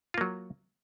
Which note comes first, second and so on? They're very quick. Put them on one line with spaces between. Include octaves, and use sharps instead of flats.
F4 A#3 F#3